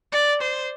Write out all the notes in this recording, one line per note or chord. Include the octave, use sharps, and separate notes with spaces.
D5
C5